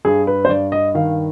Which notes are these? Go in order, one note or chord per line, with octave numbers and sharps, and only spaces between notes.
G2 G#4
B4
C5
G2 D5
D#5
D#3 F5